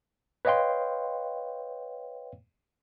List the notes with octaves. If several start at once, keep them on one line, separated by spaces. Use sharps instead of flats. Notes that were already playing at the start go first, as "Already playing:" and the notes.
B4 C#5 D#5 F5 G5 C6